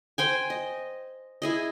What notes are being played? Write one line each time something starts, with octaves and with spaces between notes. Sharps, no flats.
C5 G5 G#5
D#5
E4 G#4 D#5